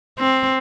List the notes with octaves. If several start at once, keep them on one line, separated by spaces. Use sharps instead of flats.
C4